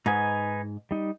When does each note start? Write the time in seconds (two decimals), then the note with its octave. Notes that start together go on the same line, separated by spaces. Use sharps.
0.06 G#2 D#4 B4 G#5
0.91 G3 D#4